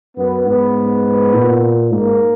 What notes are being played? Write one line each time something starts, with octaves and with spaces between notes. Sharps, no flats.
F#2 B3
G#2 B3
A#2
G#2 A#3